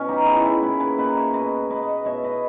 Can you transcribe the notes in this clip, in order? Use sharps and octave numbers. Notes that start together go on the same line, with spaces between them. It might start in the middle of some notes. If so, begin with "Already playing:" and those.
Already playing: B2 C#4
D#4 G4
B3 E4 G#4
E4 G#4
A#2 G#4 B4
G#4 B4
A#3 B4 D#5
C#5 E5
B2 B4 D#5
B3 B4 D#5
B2 C#5 E5
B4 D#5